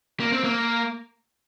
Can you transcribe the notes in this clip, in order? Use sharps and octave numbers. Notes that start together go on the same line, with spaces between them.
A#3
C4
A#3